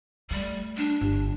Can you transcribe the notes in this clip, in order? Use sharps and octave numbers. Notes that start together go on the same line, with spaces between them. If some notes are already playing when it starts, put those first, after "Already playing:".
G3 A3
D4
G1